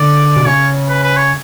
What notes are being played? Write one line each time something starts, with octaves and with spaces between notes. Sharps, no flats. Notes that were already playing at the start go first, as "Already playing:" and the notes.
Already playing: D3 D5
B2
C#3 C#5
B4
B4
C#5